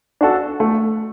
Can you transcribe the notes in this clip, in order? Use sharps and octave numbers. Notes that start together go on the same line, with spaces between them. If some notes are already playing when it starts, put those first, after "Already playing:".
D4 F#4 A4
A3